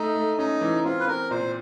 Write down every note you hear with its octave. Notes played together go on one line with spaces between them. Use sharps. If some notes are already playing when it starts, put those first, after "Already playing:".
Already playing: A3 D#4
A3
C#4 D#4
E3
C4 F4
B4
C4 A#4
A#2 C5